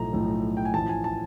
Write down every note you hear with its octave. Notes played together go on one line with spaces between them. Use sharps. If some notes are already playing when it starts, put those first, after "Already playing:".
Already playing: B1 A2 F3 A3 A#5
B1 A2 F3 A3
G5
G#5
A1 A2 F3 A5
G#5
A5